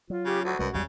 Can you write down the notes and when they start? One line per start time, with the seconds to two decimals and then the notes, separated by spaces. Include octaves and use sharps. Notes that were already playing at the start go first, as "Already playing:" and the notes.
0.10 F#3 F4
0.25 C#3 G4
0.45 D2 F#4
0.59 C2 F#2 G3 G#3 B4
0.74 G#1 E2 C#3 F#3 G3